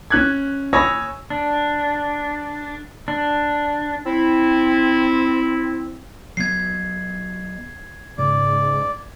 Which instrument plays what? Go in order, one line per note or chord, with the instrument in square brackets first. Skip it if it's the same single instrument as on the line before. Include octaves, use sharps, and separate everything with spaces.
[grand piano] C#4 F#6 G#6
C#5 G#5 B5 D#6 E6 A#6
[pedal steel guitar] D4
D4
[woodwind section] C4 E4
[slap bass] F#3 B3 [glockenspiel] G#6 C7
[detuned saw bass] G#2 [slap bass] C#3 [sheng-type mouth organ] D5